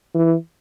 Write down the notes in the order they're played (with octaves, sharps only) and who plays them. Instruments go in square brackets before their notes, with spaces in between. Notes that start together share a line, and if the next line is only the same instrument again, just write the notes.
[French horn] E3